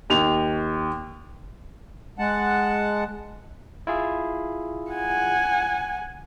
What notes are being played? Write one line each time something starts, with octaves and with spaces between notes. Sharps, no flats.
D#2 F7
G#3 F#5 A5
E4 F4 G#4
F#5 G#5